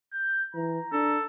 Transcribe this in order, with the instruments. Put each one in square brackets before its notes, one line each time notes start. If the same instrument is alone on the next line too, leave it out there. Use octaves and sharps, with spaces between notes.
[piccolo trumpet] G6
[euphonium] E3 [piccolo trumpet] A#5
[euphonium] D4 [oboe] A4